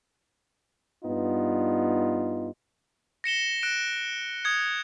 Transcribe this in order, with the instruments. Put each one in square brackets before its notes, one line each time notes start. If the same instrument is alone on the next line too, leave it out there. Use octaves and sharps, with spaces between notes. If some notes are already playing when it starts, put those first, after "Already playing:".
[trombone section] G2 B3 D#4 F4
[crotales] A#6 C#7 E7 G7
F#6 D7 E7
D#6 G#6 C#7